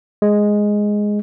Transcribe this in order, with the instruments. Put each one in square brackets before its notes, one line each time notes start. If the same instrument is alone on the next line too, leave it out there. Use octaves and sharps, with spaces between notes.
[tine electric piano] G#3